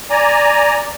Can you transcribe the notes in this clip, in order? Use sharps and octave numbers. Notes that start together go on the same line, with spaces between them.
D5 G#5 A#5